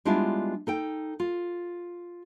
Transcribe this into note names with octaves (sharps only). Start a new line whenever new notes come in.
G3 G#3 B3 D4 E4 F4
D#4 A4 G5
F4